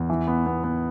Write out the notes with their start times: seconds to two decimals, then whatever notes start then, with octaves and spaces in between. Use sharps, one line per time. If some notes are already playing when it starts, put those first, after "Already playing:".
Already playing: E2
0.10 E3
0.28 B3
0.46 B3
0.64 B3